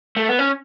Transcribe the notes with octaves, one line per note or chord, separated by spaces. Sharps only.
A3
B3
C#4